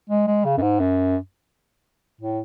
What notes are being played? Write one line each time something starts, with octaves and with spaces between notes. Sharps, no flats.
G#3
G#3
C#3
F#2
G#2
F#2
A2